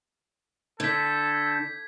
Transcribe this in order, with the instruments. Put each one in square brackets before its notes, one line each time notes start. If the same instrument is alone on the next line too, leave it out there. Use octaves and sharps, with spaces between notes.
[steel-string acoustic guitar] D3 [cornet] A4 [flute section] G6 [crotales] G#6 B6